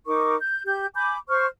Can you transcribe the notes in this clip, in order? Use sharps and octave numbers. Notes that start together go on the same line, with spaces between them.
D#4 A#4 C#6 D6
G6
G4 G6
G#5 B5 D6 G6
C5 C#6 F6